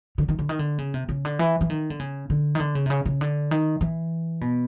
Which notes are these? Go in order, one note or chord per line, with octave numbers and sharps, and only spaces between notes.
D3
D#3
D3
D#3
D3
C#3
C3
C#3
D3
E3
E3
D#3
D3
C#3
D3
D#3
D3
C#3
C3
C#3
C#3
D3
D#3
E3
B2